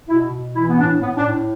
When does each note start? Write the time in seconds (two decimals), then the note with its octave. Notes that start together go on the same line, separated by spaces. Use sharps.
0.08 B2 E4
0.32 B2
0.54 E3 E4
0.67 B3
0.78 A2 D4
1.01 A2 B3
1.17 D4
1.24 A2